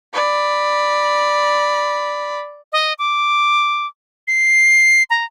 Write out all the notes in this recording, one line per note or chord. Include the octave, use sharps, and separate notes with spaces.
D5 B5
D#5
D6
C7
A#5